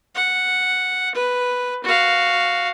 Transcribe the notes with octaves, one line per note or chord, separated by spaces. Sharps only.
F#5
B4
F#4 F5